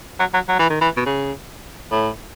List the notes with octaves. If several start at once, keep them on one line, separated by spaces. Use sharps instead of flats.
F#3
F#3
F#3
E3
D#3
E3
B2
C#3
A2